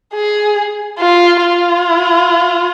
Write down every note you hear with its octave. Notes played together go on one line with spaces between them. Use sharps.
G#4
F4
F4